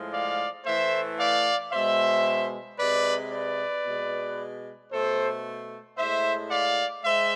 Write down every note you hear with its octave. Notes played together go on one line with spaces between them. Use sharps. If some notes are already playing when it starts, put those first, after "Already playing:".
Already playing: A2 F3 G#3
D5 F5
A2 E3 A3 C5 E5
D5 F5
B2 G#3 C5 E5
C3 G#3 B4 D5
B4 D5
B2 G#3
B2 A3 A4 C5
A2 G#3 C5 E5
D5 F5
G#3 C5 E5